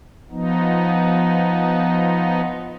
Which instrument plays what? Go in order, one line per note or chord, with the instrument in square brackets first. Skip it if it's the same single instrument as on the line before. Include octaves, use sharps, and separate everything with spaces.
[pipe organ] F3 B3 D#4